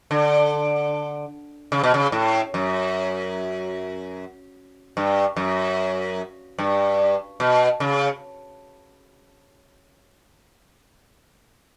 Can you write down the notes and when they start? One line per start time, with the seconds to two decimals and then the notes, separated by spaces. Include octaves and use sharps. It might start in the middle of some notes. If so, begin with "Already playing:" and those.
0.11 D3
1.72 C#3
1.83 B2
1.94 C#3
2.12 A2
2.54 F#2
4.97 G2
5.36 F#2
6.58 G2
7.40 B2
7.80 C#3